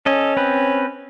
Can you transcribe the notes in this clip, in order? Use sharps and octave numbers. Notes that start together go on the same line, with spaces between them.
C#4 A4 D#5
C4 B4